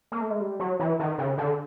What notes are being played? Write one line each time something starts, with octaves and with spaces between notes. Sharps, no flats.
A#3
A3
G#3
G3
F#3
E3
D#3
C#3
D3